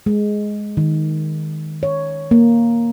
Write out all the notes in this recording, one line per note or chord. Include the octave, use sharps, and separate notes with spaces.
G#3
D#3
C#5
A#3